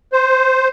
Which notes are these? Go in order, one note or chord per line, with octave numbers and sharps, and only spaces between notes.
C5